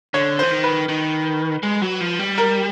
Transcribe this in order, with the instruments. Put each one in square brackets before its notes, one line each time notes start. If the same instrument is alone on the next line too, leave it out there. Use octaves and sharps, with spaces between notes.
[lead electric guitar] D3 [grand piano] C#5
[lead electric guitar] E3 [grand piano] C5
[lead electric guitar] D#3
[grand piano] B4
[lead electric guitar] D#3
G#3
F#3
F3
G3
[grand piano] A#4